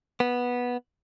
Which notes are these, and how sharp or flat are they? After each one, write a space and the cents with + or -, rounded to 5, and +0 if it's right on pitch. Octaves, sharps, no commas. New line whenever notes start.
B3 -10